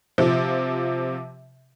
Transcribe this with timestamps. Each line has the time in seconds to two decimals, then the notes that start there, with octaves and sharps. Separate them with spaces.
0.18 C3 F3